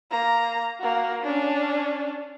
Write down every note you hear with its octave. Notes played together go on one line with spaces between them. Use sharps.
A#3 A#5
A#3 F#4
C#4 D4